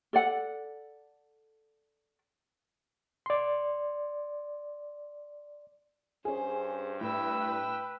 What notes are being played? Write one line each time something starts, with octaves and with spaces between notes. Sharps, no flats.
A4 D5 F#5
D5 C6
G2 C#4 G#4 C5
A2 B4 G5 E6